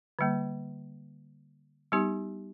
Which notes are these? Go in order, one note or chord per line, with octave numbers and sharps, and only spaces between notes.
D3 G3 A#3
G3 B3 D#4 G4